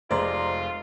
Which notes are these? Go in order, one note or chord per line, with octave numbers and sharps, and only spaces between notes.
F1 G#3 F4 C5 D5 A#5 C6